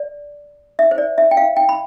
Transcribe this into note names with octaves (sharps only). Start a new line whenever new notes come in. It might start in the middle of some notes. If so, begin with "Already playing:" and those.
Already playing: D5
E5
C5
D5
E5
G5
F5
G5
B5